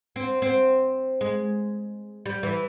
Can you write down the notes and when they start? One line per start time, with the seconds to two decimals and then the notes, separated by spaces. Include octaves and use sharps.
0.16 C4
0.42 C4
1.21 G#3
2.26 G3
2.43 E3